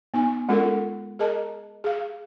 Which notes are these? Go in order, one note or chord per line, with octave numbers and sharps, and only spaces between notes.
B3 D#4 G#5
G#3 C#4 F4 A4 A#4
G#4 A#4 D#5 A5 A#5
G#4 F5